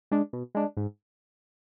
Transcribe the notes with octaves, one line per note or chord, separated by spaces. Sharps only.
G#3 D4
B2
G#3 D4
G#2